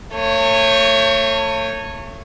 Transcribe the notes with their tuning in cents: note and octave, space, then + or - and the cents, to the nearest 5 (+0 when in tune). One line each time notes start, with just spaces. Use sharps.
A3 +40 C#5 -10